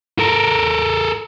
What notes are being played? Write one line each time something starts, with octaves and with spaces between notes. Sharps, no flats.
A4 A#4